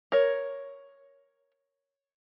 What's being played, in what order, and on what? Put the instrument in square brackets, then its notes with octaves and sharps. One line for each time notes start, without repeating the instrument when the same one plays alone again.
[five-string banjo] A#4 C#5